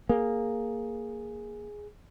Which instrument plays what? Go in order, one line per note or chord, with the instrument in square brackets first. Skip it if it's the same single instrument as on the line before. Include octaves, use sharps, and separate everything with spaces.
[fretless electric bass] A#3 [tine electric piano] G#4